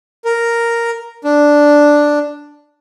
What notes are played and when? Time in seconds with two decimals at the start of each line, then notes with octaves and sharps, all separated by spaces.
0.25 A#4
1.24 D4